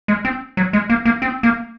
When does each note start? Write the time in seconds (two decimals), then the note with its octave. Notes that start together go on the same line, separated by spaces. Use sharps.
0.08 G#3
0.25 C4
0.57 F#3
0.73 G#3
0.90 A#3
1.05 A#3
1.22 C4
1.43 A#3